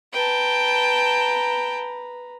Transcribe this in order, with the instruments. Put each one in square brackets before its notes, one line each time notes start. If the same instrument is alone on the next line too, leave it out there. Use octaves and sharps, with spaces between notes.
[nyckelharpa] B4 A#5 [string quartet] G5 A5